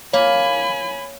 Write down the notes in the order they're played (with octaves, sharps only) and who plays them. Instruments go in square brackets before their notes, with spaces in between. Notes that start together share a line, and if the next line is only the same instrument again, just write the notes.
[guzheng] A#3 [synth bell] C#5 [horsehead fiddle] G#5 B5